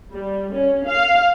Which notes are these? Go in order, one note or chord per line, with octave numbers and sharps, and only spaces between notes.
G3
C#4
F5